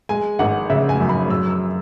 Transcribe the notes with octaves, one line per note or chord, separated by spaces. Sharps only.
G#3 G#5
G#1 F#5
C#3 E5
G#5
F#2
B5
F#3 E6
E6